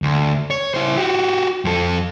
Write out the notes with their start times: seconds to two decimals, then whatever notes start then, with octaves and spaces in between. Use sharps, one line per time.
0.02 D2
0.50 C#5
0.74 E4 C5
0.97 F#4 G4
1.65 F2 A4